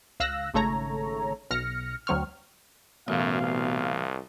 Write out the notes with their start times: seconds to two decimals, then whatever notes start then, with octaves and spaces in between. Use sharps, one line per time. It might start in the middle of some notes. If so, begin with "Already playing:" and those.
0.20 C#2 F5 E6 F#6 A#6
0.54 G#1 C#3 A3 A4 C#5 A#5
1.51 B1 F6 A#6 C#7
2.07 D2 F#3 C4 C#6 F6
3.08 A1 F#2 B2 F5
3.42 C2